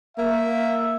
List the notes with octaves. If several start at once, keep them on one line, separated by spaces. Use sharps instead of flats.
A#3 E5